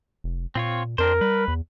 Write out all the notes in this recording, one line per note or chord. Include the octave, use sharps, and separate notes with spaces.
F1
A#2 C4 F4 C#5
F2 C4 D4 A#4 C5
G3 B4
E2